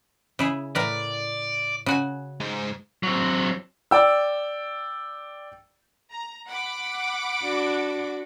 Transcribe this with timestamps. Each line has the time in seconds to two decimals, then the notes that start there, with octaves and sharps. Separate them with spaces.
0.39 C#3 E4 G#4
0.75 A2 A#4 B4 D5
1.86 C#3 F#4 G#5
2.40 G#2 G#3
3.03 F#3 C4
3.91 D5 G5 E6
6.10 A#5
6.47 F#5 B5 D6
7.43 D4 F#4